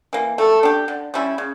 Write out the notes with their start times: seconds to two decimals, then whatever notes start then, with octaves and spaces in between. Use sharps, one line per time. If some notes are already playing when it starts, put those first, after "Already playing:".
0.13 E3 A#3
0.38 A3 A4
0.63 D4 G4
0.88 D3
1.14 G3 C#4 E4
1.38 C#3